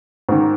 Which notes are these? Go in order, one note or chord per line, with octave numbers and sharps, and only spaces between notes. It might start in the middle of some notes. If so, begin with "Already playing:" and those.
G#2 D#3